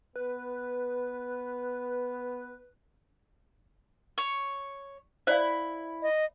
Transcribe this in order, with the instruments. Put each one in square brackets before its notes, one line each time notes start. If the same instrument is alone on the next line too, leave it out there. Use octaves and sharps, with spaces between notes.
[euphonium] B3 [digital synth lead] B4
[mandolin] C#5
[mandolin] E4 [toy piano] C5 D5 F5
[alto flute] D#5